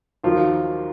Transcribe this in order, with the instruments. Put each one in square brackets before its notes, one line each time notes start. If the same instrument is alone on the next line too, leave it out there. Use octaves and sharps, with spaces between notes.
[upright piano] D#2 D#3 F#3 [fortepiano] F3 F4